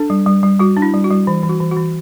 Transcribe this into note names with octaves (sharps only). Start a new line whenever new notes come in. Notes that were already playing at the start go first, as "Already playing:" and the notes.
Already playing: D4 A4
G3
G3
G3
G3 F#4
D4
E4
G3
F#4
G3
E3
E3
F#4
E3
E3 F#4